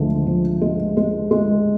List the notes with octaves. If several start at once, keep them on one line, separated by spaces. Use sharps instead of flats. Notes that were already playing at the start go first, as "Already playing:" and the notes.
Already playing: D2 F3 G#3
F3
G#3
G#3
G#3